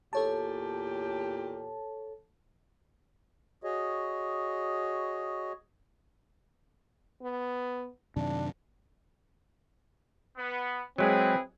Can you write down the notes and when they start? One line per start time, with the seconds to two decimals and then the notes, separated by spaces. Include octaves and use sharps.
0.13 E2 A#2 G4 A4 C#5 A5
3.64 F#4 G#4 C#5 D#5
7.22 B3
8.16 F#2 C3 D#3 D4
10.37 B3
10.98 F#3 G#3 C4 E4 G#4 B4